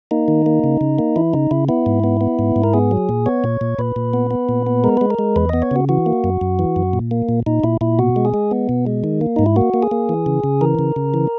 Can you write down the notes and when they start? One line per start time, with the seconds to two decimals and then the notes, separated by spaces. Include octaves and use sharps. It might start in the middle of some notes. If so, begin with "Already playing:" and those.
0.11 A#3 D#4
0.28 D#3
0.46 A#3
0.64 C#3
0.81 C#3
0.99 A#3
1.16 E3 E4
1.33 C#3 D#4
1.51 C#3 E4
1.69 B3 E4
1.86 G#2
2.04 B3
2.21 B3
2.39 G#2
2.56 G#2
2.64 A#4
2.74 B3 G#4
2.91 F#3
3.09 A#2
3.26 B3 C#5
3.44 A#2
3.61 A#2
3.79 A#2 B4
3.96 A#2
4.13 B3
4.31 B3
4.49 A#2
4.67 B3
4.84 G#3 A#4
4.97 G#3 B4
5.10 A#4
5.19 G#3
5.36 E2 B4
5.49 B3 D#5
5.62 C#5
5.71 C#3 F#4
5.89 E3 F#4
6.06 A#3
6.24 F#2
6.41 F#2
6.59 E3
6.76 F#2
6.93 A#2
7.11 A#3
7.29 A#2
7.46 A#2 D#4
7.64 A#2 E4
7.81 A#2 E4
7.99 B2 F#4
8.16 G#3
8.25 G#4
8.34 G#3
8.51 B3
8.69 B2
8.87 G#3
9.04 D#3
9.21 A#3
9.36 G#2 D#4
9.46 E4
9.56 A#3 F#4
9.74 A#3
9.83 G#4
9.91 A#3
10.09 E3
10.26 C#3
10.44 C#3
10.61 E3 A#4
10.79 C#3
10.96 C#3
11.14 E3